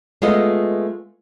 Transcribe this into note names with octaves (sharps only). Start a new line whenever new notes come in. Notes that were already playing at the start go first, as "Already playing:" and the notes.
G#3 A3 B3 F4 D#5